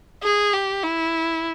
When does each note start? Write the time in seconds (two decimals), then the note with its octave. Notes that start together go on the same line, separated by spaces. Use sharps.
0.23 G#4
0.53 G4
0.83 E4